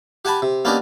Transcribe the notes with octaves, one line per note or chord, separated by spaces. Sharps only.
G4 F#5 G#5 A5 B5
C3
A#3 B3 C#4 D4 G4 D#5